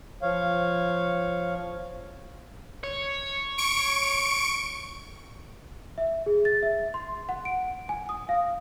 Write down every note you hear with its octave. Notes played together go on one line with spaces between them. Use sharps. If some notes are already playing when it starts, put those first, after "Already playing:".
F3 C#5 F5
C#5
C#6 D7
E5
G#4
A6
E5
C6
F#5
D7
G#5
D#6
F5